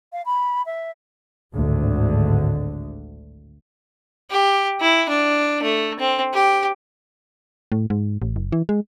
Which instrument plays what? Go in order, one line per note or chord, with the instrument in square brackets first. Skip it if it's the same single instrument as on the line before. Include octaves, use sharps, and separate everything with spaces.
[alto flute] F5
B5
E5
[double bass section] G#1 D2 A2 D3
[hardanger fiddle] G4
E4
D4
A3
C4
G4
[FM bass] A2
G#2
A1
F#1
E3
G#3